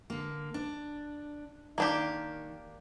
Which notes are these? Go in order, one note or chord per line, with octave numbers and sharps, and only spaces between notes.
D3 A#3
D4
D#3 A#3 D4 G4